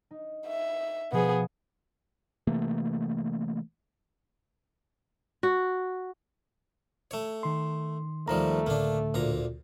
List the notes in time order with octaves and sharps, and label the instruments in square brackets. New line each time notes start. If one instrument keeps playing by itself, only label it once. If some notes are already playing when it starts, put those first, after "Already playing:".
[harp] D#4
[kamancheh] E5
[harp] B2 F3 [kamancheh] B3 G#4
[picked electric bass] C3 E3 A3 A#3
[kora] F#4
[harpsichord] A3 C#5
[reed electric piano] D#3 C6
[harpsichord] D#2 F3 G3 [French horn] A3 [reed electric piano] A#5
[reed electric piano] C#2 A2 D3 [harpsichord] A#3 D4
[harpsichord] D2 A#2 A#5